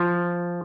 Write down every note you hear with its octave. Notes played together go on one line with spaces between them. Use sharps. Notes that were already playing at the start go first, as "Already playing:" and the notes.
Already playing: F3